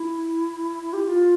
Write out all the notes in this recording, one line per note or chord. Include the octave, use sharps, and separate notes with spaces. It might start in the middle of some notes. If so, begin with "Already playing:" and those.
Already playing: E4
G4
G4
F4